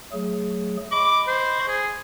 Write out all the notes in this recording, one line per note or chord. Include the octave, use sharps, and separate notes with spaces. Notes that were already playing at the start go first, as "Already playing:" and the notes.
F#3 A3 G#4
D#5 B5 C#6 D6
C5
G#4